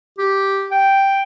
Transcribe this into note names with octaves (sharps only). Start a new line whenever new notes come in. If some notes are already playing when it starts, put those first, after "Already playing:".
G4
G5